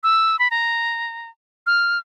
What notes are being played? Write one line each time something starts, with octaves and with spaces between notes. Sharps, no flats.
E6
B5
A#5
F6